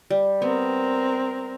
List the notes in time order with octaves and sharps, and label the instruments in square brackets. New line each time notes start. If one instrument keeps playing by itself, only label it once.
[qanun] G3
[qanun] B3 [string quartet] C4 A#4